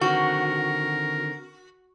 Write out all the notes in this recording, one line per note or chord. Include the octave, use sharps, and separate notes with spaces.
D3 D#3 C4 F#4 A#4